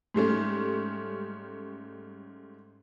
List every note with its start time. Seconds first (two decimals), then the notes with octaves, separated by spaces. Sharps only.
0.14 G#2 G3 A3 C#4